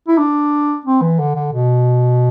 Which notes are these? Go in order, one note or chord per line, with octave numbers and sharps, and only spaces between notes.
E4
D4
C4
E3
D3
D3
B2